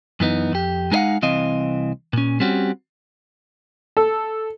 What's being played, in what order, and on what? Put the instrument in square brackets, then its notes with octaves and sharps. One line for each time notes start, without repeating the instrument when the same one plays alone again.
[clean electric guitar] F#2 E3 B3 D#4
F2 G4
G#3 D#4 A#4 D#5 F5 F#5
C2 E3 C4 D#5 F5
A#2 C#4
G3 C4 C#4 F#4 G4
[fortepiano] A4